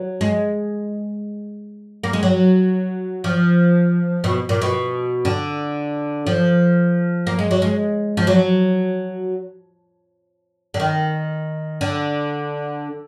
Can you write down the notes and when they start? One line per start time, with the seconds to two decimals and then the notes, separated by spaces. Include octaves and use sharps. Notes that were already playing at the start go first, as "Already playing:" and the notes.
Already playing: F#3
0.21 G#3
2.03 A#3
2.13 G#3
2.23 F#3
3.24 F3
4.24 B2
4.49 A#2
4.62 B2
5.25 D3
6.27 F3
7.27 A#3
7.39 G#3
7.51 F#3
7.62 G#3
8.17 F3
8.27 F#3
10.74 D3
10.80 D#3
11.81 D3